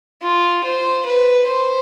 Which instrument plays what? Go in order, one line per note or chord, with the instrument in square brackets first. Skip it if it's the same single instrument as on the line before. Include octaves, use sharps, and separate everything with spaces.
[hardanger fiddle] F4
C5
B4
C5